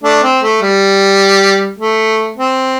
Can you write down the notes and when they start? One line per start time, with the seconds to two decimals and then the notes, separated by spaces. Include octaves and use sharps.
0.04 A3 D4
0.23 C4
0.42 A3
0.62 G3
1.79 A3
2.37 C4